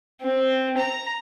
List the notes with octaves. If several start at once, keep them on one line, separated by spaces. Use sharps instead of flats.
C4
A#5